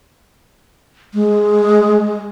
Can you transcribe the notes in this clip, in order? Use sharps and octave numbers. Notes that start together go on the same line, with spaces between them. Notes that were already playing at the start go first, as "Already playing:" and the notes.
G#3